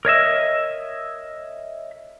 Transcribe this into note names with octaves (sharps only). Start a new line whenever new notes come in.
A#4 C#5 D#5 E5